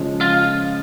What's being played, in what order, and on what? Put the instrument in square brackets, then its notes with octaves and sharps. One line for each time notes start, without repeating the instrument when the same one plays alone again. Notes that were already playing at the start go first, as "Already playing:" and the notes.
Already playing: [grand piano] C#3 F3 G#3
[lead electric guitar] F4